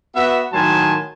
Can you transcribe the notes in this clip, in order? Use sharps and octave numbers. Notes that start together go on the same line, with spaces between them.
B3 F#4 E5
A2 D#3 F#3 G#5 A5 C6